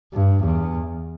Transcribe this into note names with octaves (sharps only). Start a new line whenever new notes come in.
G2
E2